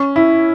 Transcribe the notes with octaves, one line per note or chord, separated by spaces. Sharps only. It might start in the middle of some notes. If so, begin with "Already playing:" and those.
Already playing: C#4
E4